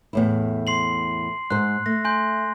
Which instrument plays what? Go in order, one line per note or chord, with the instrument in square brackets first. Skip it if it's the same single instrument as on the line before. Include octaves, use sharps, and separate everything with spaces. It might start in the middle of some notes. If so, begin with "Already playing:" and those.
[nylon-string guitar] E2 A2 E4
[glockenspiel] C6 C7 F#7
[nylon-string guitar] G#2 C5 [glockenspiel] F#6
[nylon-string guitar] A3 [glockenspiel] A#6
[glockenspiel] G#5 C6 G6